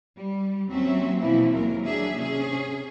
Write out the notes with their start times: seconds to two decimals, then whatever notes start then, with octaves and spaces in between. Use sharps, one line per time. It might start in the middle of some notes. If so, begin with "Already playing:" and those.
0.15 G3
0.69 D#2 F#3 C4 C#4 E5
1.20 B2 E3 F3 A#3 C4 E4
1.53 D#2 F#3 G#3 A#4
1.84 F#3 D4 G#4 E5
2.17 C3 C#4 G#4